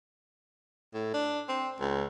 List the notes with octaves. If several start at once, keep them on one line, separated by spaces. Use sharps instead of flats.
A2
D4
C4
C#2